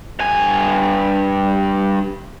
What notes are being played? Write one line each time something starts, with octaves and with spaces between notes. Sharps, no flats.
G2 G#5